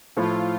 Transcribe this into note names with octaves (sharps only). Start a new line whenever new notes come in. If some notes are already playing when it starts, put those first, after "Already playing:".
A2 F3 A3 E4 F4